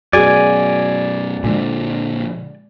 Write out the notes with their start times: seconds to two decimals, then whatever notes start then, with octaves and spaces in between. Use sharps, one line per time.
0.13 F#2 B2 F#4 G#4 D5 G#5
1.44 A#2 D3 F3 G#3